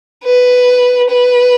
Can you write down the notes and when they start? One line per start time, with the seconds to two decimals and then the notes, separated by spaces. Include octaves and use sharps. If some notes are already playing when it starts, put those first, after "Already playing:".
0.24 B4
1.09 B4